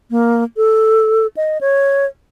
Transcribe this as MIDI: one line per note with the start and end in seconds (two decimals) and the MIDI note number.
0.10 0.44 58
0.57 1.27 69
1.37 1.58 75
1.61 2.06 73